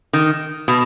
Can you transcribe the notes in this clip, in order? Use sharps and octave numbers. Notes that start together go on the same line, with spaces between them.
D#3
B2